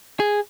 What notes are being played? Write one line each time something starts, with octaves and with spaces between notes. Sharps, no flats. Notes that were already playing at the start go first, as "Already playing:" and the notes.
G#4